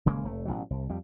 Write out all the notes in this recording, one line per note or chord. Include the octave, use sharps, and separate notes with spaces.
D#1 C#3 G#3 A#3
F1 A3
A1 G2 B2 F#3
C2
F2 G3